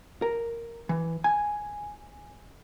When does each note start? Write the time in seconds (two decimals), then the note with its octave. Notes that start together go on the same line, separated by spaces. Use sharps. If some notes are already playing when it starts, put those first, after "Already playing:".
0.22 A#4
0.89 E3
1.24 G#5